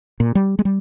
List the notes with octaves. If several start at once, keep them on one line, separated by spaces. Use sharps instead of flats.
A#2
G3
G#3
G3